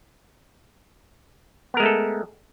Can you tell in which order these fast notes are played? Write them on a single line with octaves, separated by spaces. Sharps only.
B3 A#4 G#3 A3 A4